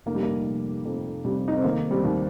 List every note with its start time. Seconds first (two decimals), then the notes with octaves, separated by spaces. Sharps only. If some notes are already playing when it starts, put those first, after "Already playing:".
0.06 F1 A#3
0.14 G3
0.23 A#3
0.46 F1
0.85 F2
1.24 C3 G3
1.48 D#4
1.56 C4
1.64 D#3 A#3
1.90 G3 C4
2.04 D#2